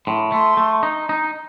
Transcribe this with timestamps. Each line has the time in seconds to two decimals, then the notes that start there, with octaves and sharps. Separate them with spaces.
0.06 A2 C6
0.32 A3 C6
0.57 A3
0.83 D#4
1.09 D#4